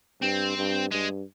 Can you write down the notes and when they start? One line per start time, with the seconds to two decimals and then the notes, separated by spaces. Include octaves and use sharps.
0.22 G2 C4
0.57 G2
0.91 G2 G#3